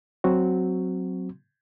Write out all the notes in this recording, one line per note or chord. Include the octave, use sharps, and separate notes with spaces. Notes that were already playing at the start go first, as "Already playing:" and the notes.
F#3 C4 F#4